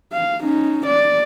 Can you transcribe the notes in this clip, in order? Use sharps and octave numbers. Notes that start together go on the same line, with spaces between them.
F5
C#4 D#4
D5